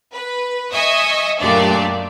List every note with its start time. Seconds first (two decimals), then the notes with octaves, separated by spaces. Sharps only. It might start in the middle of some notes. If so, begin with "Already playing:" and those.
0.13 B4
0.73 D#5 E5 G#5 C#6 D#6
1.41 F#2 A#2 A3 D4 G4 D5